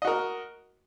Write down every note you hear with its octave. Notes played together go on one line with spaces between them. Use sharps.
F#4 A#4 D#5